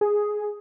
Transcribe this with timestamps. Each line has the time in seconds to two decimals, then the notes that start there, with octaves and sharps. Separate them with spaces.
0.01 G#4